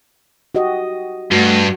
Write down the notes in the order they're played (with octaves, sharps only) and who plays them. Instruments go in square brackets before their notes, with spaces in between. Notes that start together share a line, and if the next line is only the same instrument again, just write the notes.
[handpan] F#4 G4 D#5
[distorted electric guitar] G2 [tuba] A3 [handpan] F#4